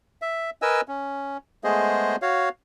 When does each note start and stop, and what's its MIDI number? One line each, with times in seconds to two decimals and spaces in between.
0.22 0.50 76
0.62 0.81 70
0.62 0.81 71
0.62 0.81 75
0.62 0.81 80
0.62 0.81 88
0.88 1.37 61
1.64 2.16 56
1.64 2.16 57
1.64 2.16 59
1.64 2.16 68
1.64 2.16 72
1.64 2.16 75
2.22 2.49 66
2.22 2.49 73
2.22 2.49 77